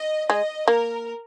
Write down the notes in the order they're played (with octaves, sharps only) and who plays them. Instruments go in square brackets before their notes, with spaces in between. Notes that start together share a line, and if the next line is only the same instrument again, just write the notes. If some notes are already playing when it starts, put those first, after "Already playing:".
Already playing: [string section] D#5
[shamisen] G#3 [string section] D#5
[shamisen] A#3 [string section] A#4